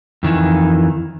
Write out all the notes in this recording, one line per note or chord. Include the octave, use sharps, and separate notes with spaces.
F2 D#3 E3